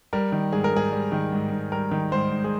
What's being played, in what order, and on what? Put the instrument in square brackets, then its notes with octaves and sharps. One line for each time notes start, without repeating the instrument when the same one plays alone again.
[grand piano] G3 A#4
D#3
G#2 G#4
A#4
G#2 G#4
G3
D#3
G#2
G#2
G3 A#4
D#3
G#2 C5
G#2
G#4